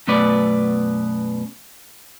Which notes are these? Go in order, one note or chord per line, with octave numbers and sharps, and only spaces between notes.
F#2 B2 A3 B3 B4 D5